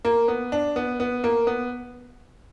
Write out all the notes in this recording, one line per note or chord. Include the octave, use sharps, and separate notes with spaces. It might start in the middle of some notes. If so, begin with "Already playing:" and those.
A#3
B3
D4
B3
B3
A#3
B3